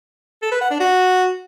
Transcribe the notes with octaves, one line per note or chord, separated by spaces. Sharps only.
A4
B4
F#5
D4
F#4